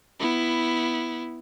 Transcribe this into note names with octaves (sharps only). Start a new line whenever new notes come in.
B3 E4